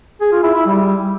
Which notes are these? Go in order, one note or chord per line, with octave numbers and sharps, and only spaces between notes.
G#4
F4
E4
E4
G3